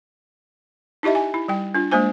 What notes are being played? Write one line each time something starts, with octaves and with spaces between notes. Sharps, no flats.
D#4 E4 G4 D#5 E5
G#5
E4
G3 G5
D4 F4
G#3 A#3 D4 C5 G#5